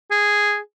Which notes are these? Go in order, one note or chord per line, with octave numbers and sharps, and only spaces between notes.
G#4